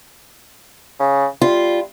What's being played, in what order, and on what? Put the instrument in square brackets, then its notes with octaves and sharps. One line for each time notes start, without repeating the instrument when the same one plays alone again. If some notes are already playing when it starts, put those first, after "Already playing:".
[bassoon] C#3
[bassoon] G3 [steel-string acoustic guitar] F4